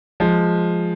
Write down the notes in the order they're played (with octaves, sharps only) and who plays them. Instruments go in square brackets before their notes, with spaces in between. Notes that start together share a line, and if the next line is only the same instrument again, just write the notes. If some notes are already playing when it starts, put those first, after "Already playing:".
[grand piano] F3 G#3